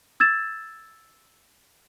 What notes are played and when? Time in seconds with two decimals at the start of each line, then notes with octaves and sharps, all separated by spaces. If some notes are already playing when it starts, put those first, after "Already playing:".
0.20 E6 G#6 A6 E7